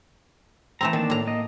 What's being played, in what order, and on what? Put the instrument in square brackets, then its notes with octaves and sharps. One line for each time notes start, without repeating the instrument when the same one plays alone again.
[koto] E3 A3 C4 [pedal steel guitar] A5 A#5
[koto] D#3 [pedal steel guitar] A#3 D4 A5
[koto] A2 A#5
[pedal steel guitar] A#3 D#5